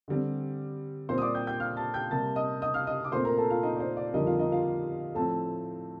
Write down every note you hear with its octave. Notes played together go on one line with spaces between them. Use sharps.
D3 G3 C4
A#2 G3 C4 C5 C6
D#6
D5 D6
G5 G6
G5 G6
F5 F6
A5 A6
G5 G6
C3 G3 A#3 A5 A6
D#5 D#6
D#5 D#6
F5 F6
D#5 D#6
D6
A#2 A3 C4 C5 C6
A#4 A#5
A4 A5
F4 F5
D#4 D#5
D5
C5
D5
F2 D3 G3 A#3 D#4 D#5
F4 F5
D#4 D#5
F4 F5
A2 F3 A3 C4 A4 A5